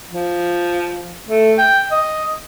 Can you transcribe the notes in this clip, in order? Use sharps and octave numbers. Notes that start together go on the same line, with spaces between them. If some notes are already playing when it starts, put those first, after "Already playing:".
F3
A3
G5
D#5